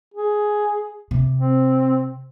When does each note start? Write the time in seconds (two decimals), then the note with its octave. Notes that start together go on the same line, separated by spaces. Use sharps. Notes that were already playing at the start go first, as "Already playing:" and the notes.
0.14 G#4
1.11 C3
1.38 C4